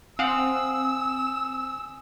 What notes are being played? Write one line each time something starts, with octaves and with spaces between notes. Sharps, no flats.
C4 F5 F#5 G#5 D#6 E6